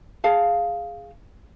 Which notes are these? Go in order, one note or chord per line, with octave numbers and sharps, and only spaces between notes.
G#4 F5 A5